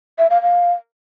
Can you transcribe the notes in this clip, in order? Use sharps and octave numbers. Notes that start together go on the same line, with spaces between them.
E5
F5
F5